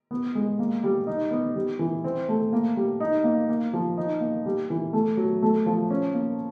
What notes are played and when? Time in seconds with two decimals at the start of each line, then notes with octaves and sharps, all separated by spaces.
0.11 B3
0.35 G#3
0.59 A#3
0.84 G3
1.07 D#4
1.31 B3
1.55 G3
1.79 E3
2.04 C4
2.29 A3
2.53 A#3
2.77 G3
3.00 D#4
3.24 A#3
3.49 A#3
3.73 F3
3.97 D#4
4.21 A#3
4.46 G3
4.70 E3
4.93 A3
5.17 F#3
5.42 A3
5.66 F3
5.90 C#4
6.14 A#3